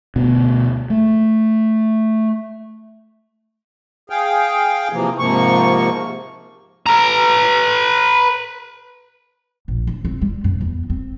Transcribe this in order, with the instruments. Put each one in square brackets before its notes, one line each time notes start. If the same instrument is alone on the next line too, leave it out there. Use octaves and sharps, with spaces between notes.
[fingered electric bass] D2 B2 B3
A3
[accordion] G#4 F5 G5
C3 E3 F3 A#3
G#2 C3 F3 A#3 C#6
[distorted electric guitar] B4 A#5
[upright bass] A#1
D3
C4
G3
F#2
E2
C4